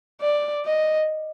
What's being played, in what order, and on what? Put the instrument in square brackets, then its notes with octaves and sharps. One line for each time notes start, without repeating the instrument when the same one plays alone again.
[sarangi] D5
D#5